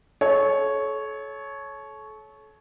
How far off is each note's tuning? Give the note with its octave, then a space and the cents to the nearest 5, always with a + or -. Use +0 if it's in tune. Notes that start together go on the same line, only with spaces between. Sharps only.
A4 -35 C#5 +0